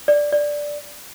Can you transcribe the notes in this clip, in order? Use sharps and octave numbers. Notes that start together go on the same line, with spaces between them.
D5
D5